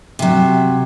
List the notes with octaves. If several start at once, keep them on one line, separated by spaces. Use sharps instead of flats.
C3 F#3